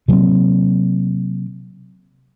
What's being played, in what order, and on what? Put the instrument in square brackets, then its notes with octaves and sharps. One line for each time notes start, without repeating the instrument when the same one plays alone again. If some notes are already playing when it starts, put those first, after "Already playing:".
[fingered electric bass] C3 F#3 A#3 C4